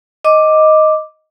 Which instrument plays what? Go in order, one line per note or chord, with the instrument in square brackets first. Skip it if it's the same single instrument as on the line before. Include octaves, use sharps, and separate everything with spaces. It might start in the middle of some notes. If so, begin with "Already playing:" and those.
[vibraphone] D#5 D6